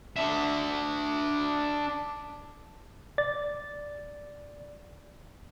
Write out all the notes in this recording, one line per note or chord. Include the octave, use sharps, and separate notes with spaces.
D4 E5
D5 A6